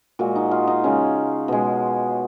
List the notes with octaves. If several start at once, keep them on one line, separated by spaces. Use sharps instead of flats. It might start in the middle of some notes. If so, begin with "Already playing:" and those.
A#2 G#3 F#4
D#4
F4
D#4
C#3 G#3 C#4
B2 G#3